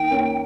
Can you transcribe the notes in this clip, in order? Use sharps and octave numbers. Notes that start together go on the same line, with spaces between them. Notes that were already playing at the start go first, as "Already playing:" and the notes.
Already playing: D#3 A#3 G5
A#3 C#4